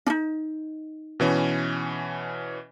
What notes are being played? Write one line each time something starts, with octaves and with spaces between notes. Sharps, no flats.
D4 D#4
B2 E3 C#4